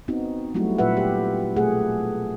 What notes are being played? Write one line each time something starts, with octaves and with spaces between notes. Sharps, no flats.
B3 C4 D#4 F#4
F#3 G3 A3 E4 F#4
A#2 F#3 F4 B4 E5 F#5
G4
B2 A3 G#4 F#5